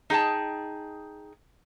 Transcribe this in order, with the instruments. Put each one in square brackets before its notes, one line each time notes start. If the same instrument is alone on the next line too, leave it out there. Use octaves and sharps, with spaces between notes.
[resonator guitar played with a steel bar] D#4 G#4 G5 A5